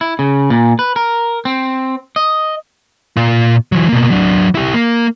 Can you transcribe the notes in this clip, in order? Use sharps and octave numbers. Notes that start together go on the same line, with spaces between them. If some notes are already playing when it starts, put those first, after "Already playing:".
E4
C#3
A#2
B4
A#4
C4
D#5
A#2 F4
E3 F#3
B2 A#3
F#3 D4
E4 G4
A#3